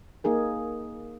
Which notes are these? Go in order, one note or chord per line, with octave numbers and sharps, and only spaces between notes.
A#3 D#4 G#4 A#4